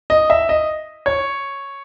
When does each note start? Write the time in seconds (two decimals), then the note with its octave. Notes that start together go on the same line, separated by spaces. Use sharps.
0.10 D#5
0.30 E5
0.49 D#5
1.06 C#5